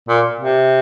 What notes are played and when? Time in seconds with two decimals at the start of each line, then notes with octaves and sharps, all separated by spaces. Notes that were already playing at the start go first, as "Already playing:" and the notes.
0.08 A#2
0.40 C3